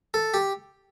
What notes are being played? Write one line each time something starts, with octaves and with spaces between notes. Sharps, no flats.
A4
G4